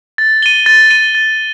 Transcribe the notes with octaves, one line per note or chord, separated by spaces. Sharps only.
A6
D#7 G7
A6
D#7 G7
A6